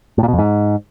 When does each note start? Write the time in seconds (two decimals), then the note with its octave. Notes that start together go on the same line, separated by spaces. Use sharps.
0.18 A2
0.23 A#2
0.28 B2
0.33 F2
0.39 G#2